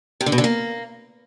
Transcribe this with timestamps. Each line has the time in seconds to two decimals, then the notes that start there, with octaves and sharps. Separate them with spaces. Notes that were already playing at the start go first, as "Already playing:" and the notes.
0.21 C3
0.26 D3
0.32 B2
0.38 D3
0.44 A#3